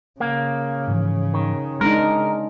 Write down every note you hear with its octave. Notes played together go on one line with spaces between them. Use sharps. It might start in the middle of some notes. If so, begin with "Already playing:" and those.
C#3 A#3
G#2 E3 F3
D#3
G#3 D4 D#4 A#4 C6